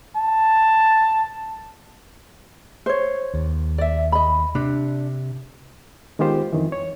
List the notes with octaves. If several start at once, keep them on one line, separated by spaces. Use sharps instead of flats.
A5
C5 C#5
D#2
D5 E5
D#5 B5
C3 D4
D#3 G#3 B3 F4 G4 C5
F2 D#3 E3
C#5